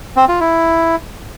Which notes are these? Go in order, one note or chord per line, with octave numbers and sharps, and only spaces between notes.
C4
F4
E4